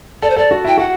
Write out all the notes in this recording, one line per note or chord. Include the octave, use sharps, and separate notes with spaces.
A4 D5
C5
A4 D5
F#4
E4 G5
F#4 F#5